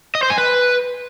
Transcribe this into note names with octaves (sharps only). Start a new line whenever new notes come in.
D#5
C5
G#5
B4